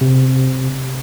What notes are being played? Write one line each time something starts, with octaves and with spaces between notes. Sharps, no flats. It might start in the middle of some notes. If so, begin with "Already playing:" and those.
C3